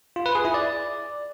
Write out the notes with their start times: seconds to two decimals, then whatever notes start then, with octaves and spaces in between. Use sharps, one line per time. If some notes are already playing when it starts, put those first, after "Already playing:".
0.16 F4
0.26 B4
0.35 G#4
0.45 E4
0.54 D5